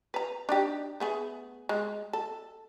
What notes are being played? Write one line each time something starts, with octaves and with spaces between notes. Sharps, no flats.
B4 A#5
D4 D#4 G4
A3 B3 G#4
G#3
A4